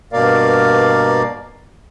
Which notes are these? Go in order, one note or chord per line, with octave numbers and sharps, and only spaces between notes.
G2 B2 A#3 A#4 D5 F5